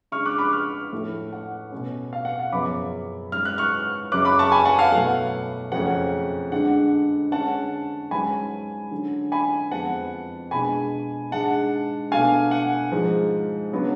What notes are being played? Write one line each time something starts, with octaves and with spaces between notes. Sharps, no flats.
C#3 G#3 D4 C#6 F6
D6 F#6
B5 D6
C#6 F6
A2 F3 A3
F#5
B2 A3 C#4
F5
F#5
F5
F#2 C#3 F3 B3 B5 D6
G#2 F#3 C#4 F6
F#6
C#6 F6
F#2 C#3 F#3 D6 F#6
B5 D6
A5 C#6
G#5 B5
F#5 A5
F5 G#5
B2 F#3 A3 F#5
F2 C#3 F#3 A3 C#4 F#5
D3 G#3 D4 F#5
D3 G#3 C#4 F#5 A5
G#2 F#3 C#4 G#5 B5
D3 F#3 C#4
G#5 B5
F2 F3 G#3 B3 F#5 A5
B2 G#3 D4 G#5 B5
G#2 G#3 D4 F#5 A5
B2 A3 D4 F5 G#5
F#5
G#2 F3 G#3
C#3 F#3 B3 D4